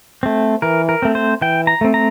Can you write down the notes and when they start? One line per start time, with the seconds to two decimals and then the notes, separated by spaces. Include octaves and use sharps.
0.23 A3 C4
0.62 E3 A#4
0.89 A#4
1.02 A3 C4
1.15 C5
1.42 E3 G5
1.67 A#5
1.81 A3 C4
1.94 A#5